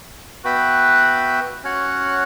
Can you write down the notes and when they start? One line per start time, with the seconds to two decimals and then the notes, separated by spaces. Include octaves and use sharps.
0.44 B3 F#4 B4 E5 G5
1.64 C#4 F#4 C#5 F#5